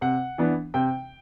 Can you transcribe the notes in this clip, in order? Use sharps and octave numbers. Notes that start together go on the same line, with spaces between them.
C3 F#5
E3 B3 D4
C3 G5